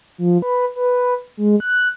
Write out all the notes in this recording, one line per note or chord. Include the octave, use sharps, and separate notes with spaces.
F3
B4
B4
G#3
F#6